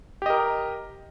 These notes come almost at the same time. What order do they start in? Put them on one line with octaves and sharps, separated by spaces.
G4 D#5 A#4 A#5